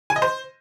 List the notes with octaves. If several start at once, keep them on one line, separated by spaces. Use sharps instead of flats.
G#5
D#5
C5